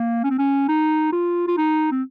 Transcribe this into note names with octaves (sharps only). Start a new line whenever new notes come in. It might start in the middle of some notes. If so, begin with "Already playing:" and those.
Already playing: A#3
C#4
C4
C#4
D#4
F4
F4
D#4
C4